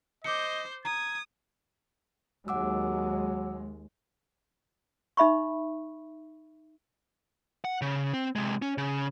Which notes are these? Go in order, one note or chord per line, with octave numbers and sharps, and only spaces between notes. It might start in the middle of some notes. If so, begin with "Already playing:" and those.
C5 D#5 D6 G6 C#7
A#5 D#6 G#6
D#2 F#3 G#3 F#5 D6 E6
D#4 E5 B5 C#6
F#5
C#3
C4
C3 G#3
C#4
C#3